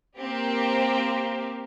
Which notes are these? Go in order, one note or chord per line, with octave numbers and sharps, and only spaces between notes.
A#3 C4 G4